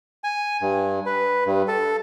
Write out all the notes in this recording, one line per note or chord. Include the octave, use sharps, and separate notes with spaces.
G#5
G2
B4
G2
A4